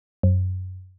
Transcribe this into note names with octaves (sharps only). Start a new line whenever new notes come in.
F#2